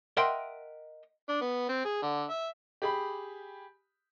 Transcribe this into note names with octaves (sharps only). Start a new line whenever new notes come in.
A#4 D#5 E5 F#5 G5 C6
D4
B3
C4
G#4
D3
E5
G4 G#4 B5